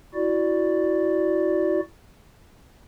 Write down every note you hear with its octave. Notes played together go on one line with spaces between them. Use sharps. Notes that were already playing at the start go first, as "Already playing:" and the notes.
E4 F#4 D5